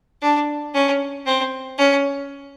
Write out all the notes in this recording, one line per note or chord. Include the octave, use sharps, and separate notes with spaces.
D4
C#4
C4
C#4